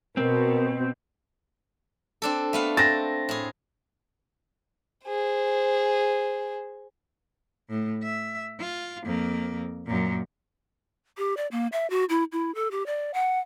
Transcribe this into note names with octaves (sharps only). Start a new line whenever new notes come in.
B2 C4 A#4
C4 D4 A4
A3 B3 F5
C4 A6 A#6
A2 G#4
G#4 C5
A2
E5
F4
F2 A#3
F#2 A#2
G4
D5
A#3
E5
F#4
E4
E4
A4
G4
D5
F#5